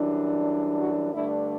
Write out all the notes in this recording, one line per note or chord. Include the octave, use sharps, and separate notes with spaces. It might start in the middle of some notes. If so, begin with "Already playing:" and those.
Already playing: F#2 E3 G3 D4
F#4
G2 D3 A3 D4 E4